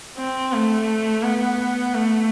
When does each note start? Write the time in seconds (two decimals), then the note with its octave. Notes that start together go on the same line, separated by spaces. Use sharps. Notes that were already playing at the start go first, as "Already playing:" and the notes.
0.18 C4
0.53 A3
1.23 B3
1.94 A3